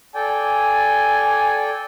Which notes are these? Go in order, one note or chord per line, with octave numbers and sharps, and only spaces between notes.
A4 D5 G5 G#5